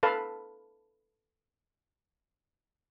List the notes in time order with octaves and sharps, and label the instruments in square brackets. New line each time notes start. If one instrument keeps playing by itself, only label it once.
[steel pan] A4 B4 F5 A5